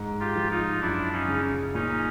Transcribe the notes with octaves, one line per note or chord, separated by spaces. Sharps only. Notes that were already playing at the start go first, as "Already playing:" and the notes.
Already playing: G#2
F4 G4
F3
D#4 F4
F#2 D4 E4
C#4 D#4
C#3
A#2 C#4 D#4